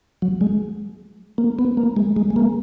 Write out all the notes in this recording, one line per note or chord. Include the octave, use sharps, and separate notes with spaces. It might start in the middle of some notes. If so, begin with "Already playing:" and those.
F#3
G#3
A#3
B3
A#3
G#3
G#3
G#3
A#3